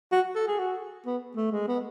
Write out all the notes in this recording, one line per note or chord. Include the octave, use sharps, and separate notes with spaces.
F#4
A4
G#4
F#4
B3
A3
G#3
B3